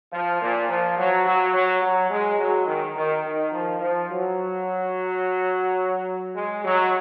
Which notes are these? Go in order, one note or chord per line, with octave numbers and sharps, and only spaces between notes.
F3
A#2
F3
F#3
F#3
F#3
F#3
G#3
F#3
D#3
D#3
D#3
F3
F3
F#3
G#3
F#3